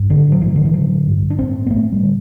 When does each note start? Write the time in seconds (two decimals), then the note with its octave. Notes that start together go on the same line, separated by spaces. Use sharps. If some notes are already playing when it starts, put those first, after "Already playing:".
Already playing: G2
0.09 A1 D3
0.32 F#3
0.41 A1 E3
0.56 D3
0.65 E3
0.74 D3 F#3
1.07 G2
1.30 D4
1.38 A1 C4
1.66 B3
1.70 A1 A3
1.92 G3
2.03 D3